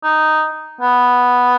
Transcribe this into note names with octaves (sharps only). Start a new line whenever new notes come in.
D#4
B3